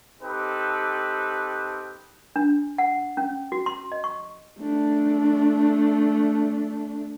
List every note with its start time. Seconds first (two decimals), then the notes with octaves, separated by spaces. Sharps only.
0.21 C4 D#4 G4 A4 B4
2.36 D4
2.78 F#5
3.17 C#4
3.52 F#4
3.66 C6
3.92 D#5
4.04 C#6
4.60 A3 D4